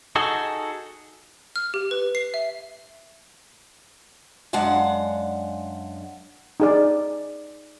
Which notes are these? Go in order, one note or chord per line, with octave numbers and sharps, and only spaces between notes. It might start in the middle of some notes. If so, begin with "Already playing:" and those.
D#4 F#4 G#4 A4
F6
G4
B4
C7
E5
F#2 G#3 D4 F5 F#5
D#4 G#4 D5